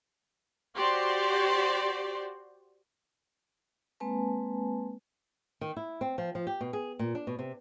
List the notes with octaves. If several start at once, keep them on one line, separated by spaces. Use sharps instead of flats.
F#4 G4 C5 D5 C6
G#3 A#3 C4 B4 G#5 A5
D#3
E4
C4
F3
F3
G4
B2
G#4
A#2
D4
B2
C3